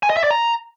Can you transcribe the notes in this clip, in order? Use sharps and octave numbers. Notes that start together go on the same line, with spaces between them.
G#5
D#5
E5
D5
A#5